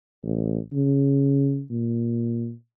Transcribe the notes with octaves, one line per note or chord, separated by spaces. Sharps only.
A1
C#3
A#2